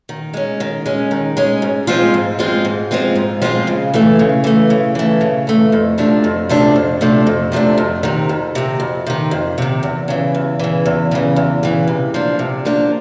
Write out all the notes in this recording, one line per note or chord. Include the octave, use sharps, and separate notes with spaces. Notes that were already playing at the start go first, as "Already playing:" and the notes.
D#3
G#3 C#4
D#3
G#3 C#4
D#3
G#3 C#4
G#2
F3 G#3 C4 F4
G#2
F3 G#3 C4 F4
G#2
F3 G#3 C4 F4
G#2
F3 G#3 C4 F4
C#3
E3 A3
C#3
E3 A3
C#3
E3 A3
C#3
E3 A3
F2
C3 F3 A3 D4
F2
C3 F3 A3 D4
F2
C3 F3 A3 D4
F2
C3 F3 A3 D4
F2
C3 D#3
F2
C3 D#3
F2
C3 D#3
F2
C3 D#3
E2
C#3 E3
E2
C#3 E3
E2
C#3 E3
E2
C#3 E3
C3
F3 A#3 D4
C3
F3 A#3 D4